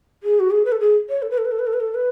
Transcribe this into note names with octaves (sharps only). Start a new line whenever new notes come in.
G#4
F#4
G#4
B4
A4
G#4
C#5
A4
B4
A4
B4
A4
B4
A4
B4
A4
B4